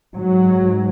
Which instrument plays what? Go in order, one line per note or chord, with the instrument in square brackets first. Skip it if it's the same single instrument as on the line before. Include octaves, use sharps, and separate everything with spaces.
[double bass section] G#2 F#3